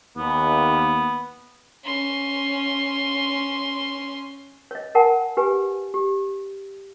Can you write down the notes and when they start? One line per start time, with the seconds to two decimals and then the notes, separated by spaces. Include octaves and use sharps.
0.17 D#2 B3
1.85 C#4 C6
4.71 C#5 D#5
4.95 A#4 F#5 G#5 A5
5.37 G4 B4 G#5
5.94 G4